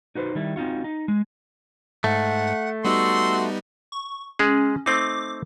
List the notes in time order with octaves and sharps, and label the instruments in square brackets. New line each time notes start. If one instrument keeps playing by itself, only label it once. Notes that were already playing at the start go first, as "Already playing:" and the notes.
[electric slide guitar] D#4 F#4 B4 C5
D#3 G3 E4
C4 D#4 F4 F#4
D#4
G#3
[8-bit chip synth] G#2 [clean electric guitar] A3 [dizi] F#5
[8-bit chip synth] G3 B3 D#4 [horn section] F#4 C6 [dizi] E6
[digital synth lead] C#6
[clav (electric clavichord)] G#3 G#4 [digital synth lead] C#4
[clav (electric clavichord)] A3 C4 D#4 [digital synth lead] D6